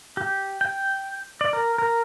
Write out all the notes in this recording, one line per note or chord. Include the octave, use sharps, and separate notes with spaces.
G4
G5
D5
A#4
A#4